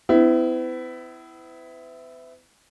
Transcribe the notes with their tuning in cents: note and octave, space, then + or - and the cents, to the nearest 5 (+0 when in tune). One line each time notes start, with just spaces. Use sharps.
B3 +45 E4 +0